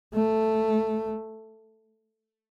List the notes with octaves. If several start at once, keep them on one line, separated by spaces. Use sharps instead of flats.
A3